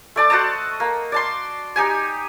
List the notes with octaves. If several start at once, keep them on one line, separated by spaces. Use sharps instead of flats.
A3 D5 A5
F#4 C5 D#5 A5
A#3
D5 A5 C6
D#4 G4 G#5